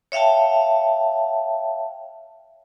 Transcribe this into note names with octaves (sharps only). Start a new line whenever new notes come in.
C#5 E5 F5 G5 A5